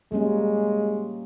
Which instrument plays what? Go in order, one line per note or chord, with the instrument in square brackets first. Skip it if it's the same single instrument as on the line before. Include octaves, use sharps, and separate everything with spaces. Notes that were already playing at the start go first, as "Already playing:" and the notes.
[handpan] G3 A#3 C#4 [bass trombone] G#3